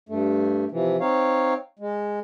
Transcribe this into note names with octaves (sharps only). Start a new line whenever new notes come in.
G2 A3
C3 E3 F3
C4 D#4 C#5 F5
G#3